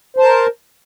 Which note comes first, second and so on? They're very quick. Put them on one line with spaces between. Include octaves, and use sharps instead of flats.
C5 A5 A#4